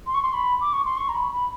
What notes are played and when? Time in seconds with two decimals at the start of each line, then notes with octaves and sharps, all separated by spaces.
0.07 C6
0.14 C#6
0.23 C6
0.34 B5
0.61 D6
0.73 C#6
0.85 C6
0.97 C#6
1.09 A#5
1.15 B5
1.33 B5